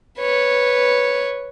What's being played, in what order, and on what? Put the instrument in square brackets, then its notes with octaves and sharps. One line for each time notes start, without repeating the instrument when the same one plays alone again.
[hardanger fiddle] B4 C#5